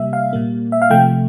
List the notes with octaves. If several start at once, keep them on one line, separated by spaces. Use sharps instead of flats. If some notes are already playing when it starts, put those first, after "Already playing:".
Already playing: C3 G3 A#3 E5
F5
A#2 G3 A#3
E5
F5
C3 F3 A3 G5